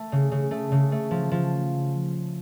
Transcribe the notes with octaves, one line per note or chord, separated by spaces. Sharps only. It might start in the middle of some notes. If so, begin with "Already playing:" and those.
Already playing: A3
C#3
C#3
A3
C#3
A3
F3
F3